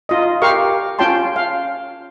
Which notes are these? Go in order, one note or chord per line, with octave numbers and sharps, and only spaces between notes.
D#4 F4 D#5
G4 A#4 F5 C#6
C#4 F4 C#5 G5 A5 C6
F5